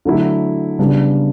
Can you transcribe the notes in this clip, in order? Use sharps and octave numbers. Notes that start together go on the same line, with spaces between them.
D3 F#3 A3 E4
C#3 G3 B3 D4